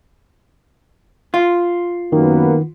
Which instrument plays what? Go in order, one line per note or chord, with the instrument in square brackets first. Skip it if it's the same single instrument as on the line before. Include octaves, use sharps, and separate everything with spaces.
[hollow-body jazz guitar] F4
[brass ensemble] F#2 A#3 B3 [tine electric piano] D#3